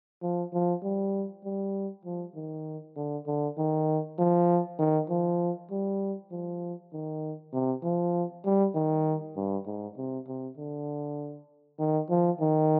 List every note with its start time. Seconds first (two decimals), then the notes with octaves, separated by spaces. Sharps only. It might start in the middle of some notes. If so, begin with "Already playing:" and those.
0.22 F3
0.53 F3
0.83 G3
1.45 G3
2.05 F3
2.35 D#3
2.96 D3
3.27 D3
3.58 D#3
4.19 F3
4.79 D#3
5.09 F3
5.71 G3
6.32 F3
6.93 D#3
7.53 C3
7.83 F3
8.45 G3
8.75 D#3
9.36 G2
9.66 G#2
9.97 C3
10.28 C3
10.57 D3
11.79 D#3
12.10 F3
12.40 D#3